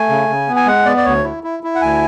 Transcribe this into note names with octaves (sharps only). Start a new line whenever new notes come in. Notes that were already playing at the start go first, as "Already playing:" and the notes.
Already playing: A3 G#5
C#3
C#3
B3
G#5
G#3 F#5
B3 D5
D5
D2 C#5
E4
E4
E4
F#5
D2 G#5